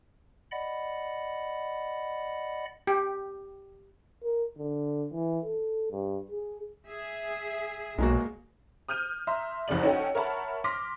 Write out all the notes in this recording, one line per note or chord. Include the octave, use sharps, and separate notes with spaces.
D5 D#5 F#5 B5
G4
A#4
D3
E3
A4
G2
G#4
G#4 E5
B1 A#2 G#3 A#3 F#4
D#6 F6 G6 D#7
E5 A#5 C6
F1 C2 F#2 C#3 D5 F#7
C#4 D#4 F#4 A4 F#5 G5
A#4 C#5 E5 F#5 A5 B5
C6 D6 F6 A#6 B6